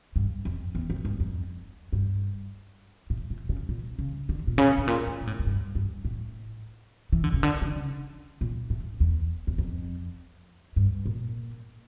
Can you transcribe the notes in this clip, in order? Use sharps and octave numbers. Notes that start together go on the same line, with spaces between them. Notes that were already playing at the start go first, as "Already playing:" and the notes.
G2
F2
E2
F2
G2
F2
G2
A2
A#2
C#3
A#2
C#3
D3
A#2
C#3
A2
A#2
A2
A#2
A2
A2
G2
G2
A2
E3
D3
C#3
D3
C#3
A#2
A2
E2
E2
F2
G2
A#2